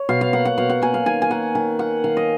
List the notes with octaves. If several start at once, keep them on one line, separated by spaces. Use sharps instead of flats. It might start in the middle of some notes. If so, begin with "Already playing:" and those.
Already playing: C#5
B2 F5
F5
A#3 F#5
F#5
B2 F5
F#5
A#3 G#5
F5
D#3 G#5
G#5
A#3 F#5
D#3 G#5
A#3 F#5
D#3 F5
D#5